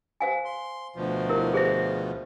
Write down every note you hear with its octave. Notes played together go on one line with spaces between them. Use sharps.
C5 F5 G#5
C6
D2 B2 F3
E4 A#4
G#4 C5 E5